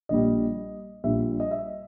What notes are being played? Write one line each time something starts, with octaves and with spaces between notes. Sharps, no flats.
A#1 A#2 G3 D#5
A#1 A#2 G3 E5
D#5
E5